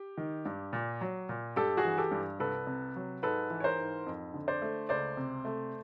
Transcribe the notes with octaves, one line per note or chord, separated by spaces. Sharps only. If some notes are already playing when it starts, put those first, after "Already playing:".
Already playing: G4
D#3
G2
A#2
F#3
A#2
G2 G4 A4
F#4 G#4
E3
G4 A4
G2
C2 A4 B4
C3
F#3
G#2 A4 B4
E3
C#5
A#4 C5
G#2
F2
D3
C5 D5
A3
C#2 C5 D5
C3
A3